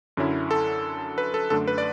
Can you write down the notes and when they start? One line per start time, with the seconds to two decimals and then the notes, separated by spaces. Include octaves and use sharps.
0.17 F#2 D3 F#3 C#4 E4
0.51 A4
1.18 B4
1.34 A4
1.50 F#2 D3 A3 D4 A4
1.68 B4
1.78 D5